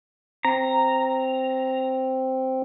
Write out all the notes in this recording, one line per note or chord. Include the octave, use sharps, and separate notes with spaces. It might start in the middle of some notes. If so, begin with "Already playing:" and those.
C4 A#5